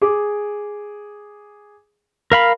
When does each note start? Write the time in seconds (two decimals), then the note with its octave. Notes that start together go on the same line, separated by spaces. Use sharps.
0.01 G#4 D6
2.32 A#4 F5 B5